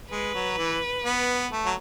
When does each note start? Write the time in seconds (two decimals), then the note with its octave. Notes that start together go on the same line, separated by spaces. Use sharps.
0.11 G#3 B4
0.35 F#3
0.58 E3
1.04 B3
1.52 A3
1.66 F#3